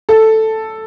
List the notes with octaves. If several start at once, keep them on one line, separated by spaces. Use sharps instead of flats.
A4